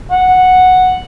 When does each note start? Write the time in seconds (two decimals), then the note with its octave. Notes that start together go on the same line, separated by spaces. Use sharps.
0.11 F#5